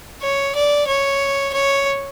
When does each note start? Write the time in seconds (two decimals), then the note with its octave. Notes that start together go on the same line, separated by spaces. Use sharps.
0.22 C#5
0.56 D5
0.88 C#5
1.54 C#5